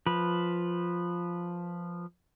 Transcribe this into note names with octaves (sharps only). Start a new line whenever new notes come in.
F3 B4